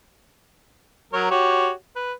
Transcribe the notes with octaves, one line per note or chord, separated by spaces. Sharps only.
F#3 A#4 C#5
F#4 G4 C#5
B4